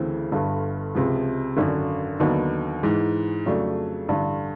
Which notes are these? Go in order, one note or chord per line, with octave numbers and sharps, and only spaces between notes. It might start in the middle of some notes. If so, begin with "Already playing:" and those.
Already playing: D2 C#3 E3 A3 C4
G1 G2 D3
C#2 C3 F3 G#3
G#1 F#2 D3
D#2 D3 F#3 B3 D#4
G#2 E3 G#3
F2 C#3 F#3 A3 D4
A1 G2 D3